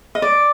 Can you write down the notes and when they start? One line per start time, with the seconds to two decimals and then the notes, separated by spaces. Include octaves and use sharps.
0.15 D#5
0.22 D5